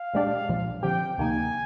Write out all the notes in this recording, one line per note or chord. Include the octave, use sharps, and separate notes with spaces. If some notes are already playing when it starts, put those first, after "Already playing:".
Already playing: F5
A#2 G#3 D4 G4 D5
A#1 A#2 F3
D3 F3 C4 G4 G5
D2 C3 D#3 A#3 D#4 G#5